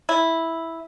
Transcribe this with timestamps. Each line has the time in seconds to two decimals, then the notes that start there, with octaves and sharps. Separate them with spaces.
0.09 E4